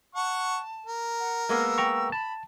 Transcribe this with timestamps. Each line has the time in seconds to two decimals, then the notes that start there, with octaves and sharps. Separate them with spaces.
0.15 F#5 A5 C#6
0.86 A#4
1.20 F#5
1.49 G#3 A#3 B3 E6
1.78 G5 A#5 C#6
2.12 A5 B5